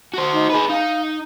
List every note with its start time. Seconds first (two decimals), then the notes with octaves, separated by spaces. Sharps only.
0.14 F#4 C5
0.33 D#4
0.51 G#4 B4
0.70 D#4 F5